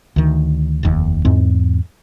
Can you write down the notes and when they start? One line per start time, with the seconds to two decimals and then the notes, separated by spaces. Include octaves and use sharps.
0.16 D2 D#3
0.83 F1 D#2
1.25 E2 G#2 C4